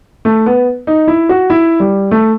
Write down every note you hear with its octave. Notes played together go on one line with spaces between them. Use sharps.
A3
B3
D#4
E4
F#4
E4
G3
A3